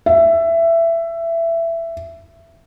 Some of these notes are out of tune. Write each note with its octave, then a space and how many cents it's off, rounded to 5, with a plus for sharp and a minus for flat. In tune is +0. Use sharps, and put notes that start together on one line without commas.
E5 +15